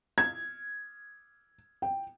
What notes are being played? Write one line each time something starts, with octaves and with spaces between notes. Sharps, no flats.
G#6
G5